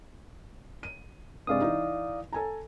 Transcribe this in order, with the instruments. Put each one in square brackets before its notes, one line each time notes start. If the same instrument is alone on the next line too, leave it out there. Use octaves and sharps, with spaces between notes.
[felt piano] D#7
[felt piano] G2 C3 G#3 [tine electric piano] D5 F5 D#6
[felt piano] E3 D#4
A4 G#5 A#5